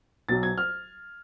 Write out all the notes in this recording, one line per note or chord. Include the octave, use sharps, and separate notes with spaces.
B1 B2 F#3 A6
G#6
F6